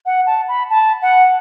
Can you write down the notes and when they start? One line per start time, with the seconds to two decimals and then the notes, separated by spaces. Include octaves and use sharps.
0.06 F#5
0.26 A5
0.48 B5
0.70 A5
1.02 F#5